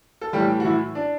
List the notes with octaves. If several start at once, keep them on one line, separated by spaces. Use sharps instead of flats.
A4
A2 E3 G3 G4
F#4
E3 E4
D4